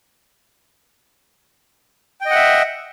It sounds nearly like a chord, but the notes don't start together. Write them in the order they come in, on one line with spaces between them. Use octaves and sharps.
G5 D#5 F#5 E5